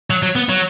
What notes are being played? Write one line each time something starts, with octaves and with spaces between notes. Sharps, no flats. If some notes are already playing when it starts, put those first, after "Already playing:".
F#3
F#3
B3
F#3